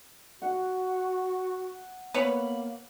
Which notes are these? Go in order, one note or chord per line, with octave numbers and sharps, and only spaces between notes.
F#4 F#5
A#3 B3 B4 C#5 B5 F#7